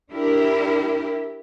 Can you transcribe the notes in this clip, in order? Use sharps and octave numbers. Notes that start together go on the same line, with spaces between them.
D4 E4 G4 A#4